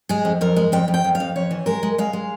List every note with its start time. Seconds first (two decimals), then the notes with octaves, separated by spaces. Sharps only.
0.09 G#3 G#4
0.25 F2
0.41 F2 A#4
0.56 G#3
0.72 F2 G5
0.88 F2
0.94 G5
1.04 F2
1.15 F5
1.20 F2
1.36 F2 C#5
1.51 E3
1.66 G#3 A#4
1.83 G#3
1.98 G#3 F5
2.13 G#3